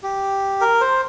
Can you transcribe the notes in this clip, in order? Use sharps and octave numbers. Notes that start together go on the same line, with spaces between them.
G4
A#4
C5